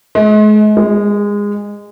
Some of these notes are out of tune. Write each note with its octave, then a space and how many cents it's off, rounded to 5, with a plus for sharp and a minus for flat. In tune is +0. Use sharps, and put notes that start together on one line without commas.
G#3 +40
G#3 -20